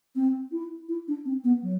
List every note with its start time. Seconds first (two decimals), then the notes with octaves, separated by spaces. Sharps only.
0.16 C4
0.52 E4
0.89 E4
1.08 D4
1.25 C4
1.44 B3
1.63 F#3